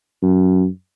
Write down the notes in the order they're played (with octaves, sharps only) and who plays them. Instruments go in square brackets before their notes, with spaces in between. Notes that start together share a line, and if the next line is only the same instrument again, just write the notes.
[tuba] F#2